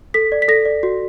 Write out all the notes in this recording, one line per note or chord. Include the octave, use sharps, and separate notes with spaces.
A4 B6
D5
B6
A4 A#6
D5
F#4